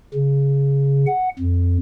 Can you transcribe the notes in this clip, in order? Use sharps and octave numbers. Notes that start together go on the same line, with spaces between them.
C#3
F#5
F2